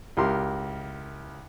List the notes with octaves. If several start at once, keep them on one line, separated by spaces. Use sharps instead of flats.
C#2 E4 G4 A#4 C6